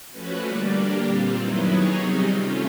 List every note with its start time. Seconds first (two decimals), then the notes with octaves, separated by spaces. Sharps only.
0.10 F3 A3 C#4 F#4 B4
0.42 D3 G3 A#3 D4
0.73 G3 A#3 D4 G4
1.03 A#2 G3 C4 F4
1.33 F#2 D#3 F#3 B3 E4
1.65 F#3 B3 D#4 G#4 C#5
1.96 C3 D#3 G3 C4 D#4
2.27 A3 C#4 F4